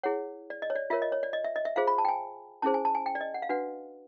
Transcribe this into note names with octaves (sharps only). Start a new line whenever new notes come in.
E4 G#4 C#5 F#5
D5
D#5
C#5
D5
F4 A#4 C#5 E5
D#5
C#5
D5
D#5
E5
D#5
E5
F4 G#4 C5 F5
B5
A5
G5
G#5
C#4 E4 G#4 C5 A5
G#5
A5
G#5
G5
D5
D#5
F#5
F5
D4 F#4 B4 F#5